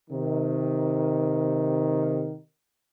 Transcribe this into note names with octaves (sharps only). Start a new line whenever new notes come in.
C3 D#3